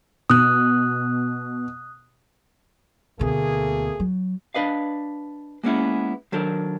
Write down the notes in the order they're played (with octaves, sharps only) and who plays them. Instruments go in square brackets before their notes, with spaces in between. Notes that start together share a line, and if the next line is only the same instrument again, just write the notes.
[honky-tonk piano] B2 [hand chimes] D#6 F#6
[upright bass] D2 B2 [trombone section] A3 A#3 G#4
[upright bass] F#3
[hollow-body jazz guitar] D4 B4 D#5 F5
G#3 A#3 B3 C#4 E4
D#3 F#3 D4 A4 A#4